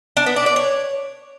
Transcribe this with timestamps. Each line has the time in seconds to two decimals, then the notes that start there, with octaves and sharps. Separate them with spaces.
0.17 D4
0.26 B3
0.36 D4
0.46 D5
0.56 C#5